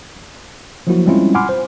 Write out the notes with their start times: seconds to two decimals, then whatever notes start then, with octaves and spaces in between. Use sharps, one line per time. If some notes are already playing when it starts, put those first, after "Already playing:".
0.87 F3 F#3 A#3 E4 F#4
1.06 G3 G#3 C4 C#4 E4 F4
1.35 F#5 G#5 B5 C6 D6 F6
1.49 C5